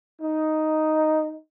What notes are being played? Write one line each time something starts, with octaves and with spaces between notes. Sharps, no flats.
D#4